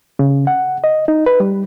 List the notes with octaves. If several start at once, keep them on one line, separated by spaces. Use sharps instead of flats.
C#3
F#5
D#5
D#4
B4
G3